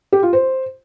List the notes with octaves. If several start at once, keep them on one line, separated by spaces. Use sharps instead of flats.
G4
F4
C5